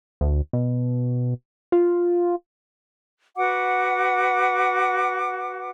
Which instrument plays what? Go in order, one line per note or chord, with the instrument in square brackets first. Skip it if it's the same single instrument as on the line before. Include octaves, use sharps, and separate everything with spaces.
[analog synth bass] D2
B2
F4
[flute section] F#4 B4 F#5 D6